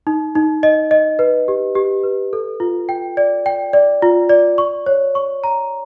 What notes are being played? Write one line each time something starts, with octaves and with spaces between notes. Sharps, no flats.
D#4
D#4
D#5
D#5
B4
G4
G4
B4
A4
F4
G5
D5
G5
D5
F4
D5
C#6
C#5
C#6
A#5